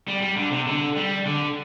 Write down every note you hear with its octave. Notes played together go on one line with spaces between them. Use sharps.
G3
G3
D3
C3
D3
G3
D3